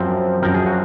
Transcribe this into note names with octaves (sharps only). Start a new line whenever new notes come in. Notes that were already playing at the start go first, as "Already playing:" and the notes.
Already playing: F#2 F3 C4
F#2 F3 C4 A#4
G#4
F#4